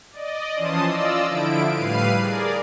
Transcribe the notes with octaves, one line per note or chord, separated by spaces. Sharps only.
D5 D#5
E3 F3 C#4 A5 C6 D#6
F4 D5 D#5 E6
D3 F3 E4 D7
A2 G3 B4 F5 C7 D#7
G#4 A#4 D5